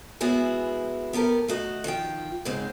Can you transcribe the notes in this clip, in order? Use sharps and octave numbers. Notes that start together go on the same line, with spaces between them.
E3 G#3 B3 E4 F#4 G#4
B3 G4 A4 A#4
A3 F#4 D#5
D#3 F3 F4 G5
G#2 C#3 G#3 C4